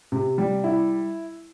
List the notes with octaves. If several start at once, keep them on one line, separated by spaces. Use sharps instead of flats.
C3
G3
E4